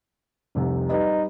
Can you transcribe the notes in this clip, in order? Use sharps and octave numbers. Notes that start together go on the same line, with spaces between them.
F1 C2 C3
G3 D#4 B4